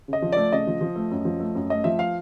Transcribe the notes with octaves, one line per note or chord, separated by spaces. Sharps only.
C#3 D#5
F3
A3 D5
C#3 D#5
F3
F3
A3
F#2
F3
A3
F#2
A3 D#5
F3 E5
F5